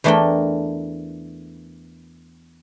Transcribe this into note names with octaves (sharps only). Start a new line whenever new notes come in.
E2 E3 A3 D4 A#4 G5